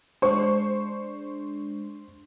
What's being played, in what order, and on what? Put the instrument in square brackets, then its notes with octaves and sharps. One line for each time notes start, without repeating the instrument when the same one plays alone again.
[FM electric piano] G#3 D4 [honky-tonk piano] C5 C#6